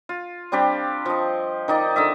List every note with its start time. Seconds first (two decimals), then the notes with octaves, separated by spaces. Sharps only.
0.09 F4
0.52 G3 C4 D4 G4
1.05 F3 D#5
1.68 D#3 D#4 D5
1.96 D3 D#5 E5